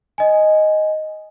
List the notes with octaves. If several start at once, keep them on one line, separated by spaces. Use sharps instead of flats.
D#5 G#5